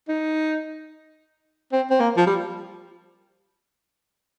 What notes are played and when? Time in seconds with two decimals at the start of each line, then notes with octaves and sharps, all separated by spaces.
0.08 D#4
1.72 C4
1.90 C4
2.00 A#3
2.17 F3
2.27 G3